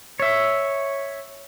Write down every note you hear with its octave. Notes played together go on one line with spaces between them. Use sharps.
C#5 E5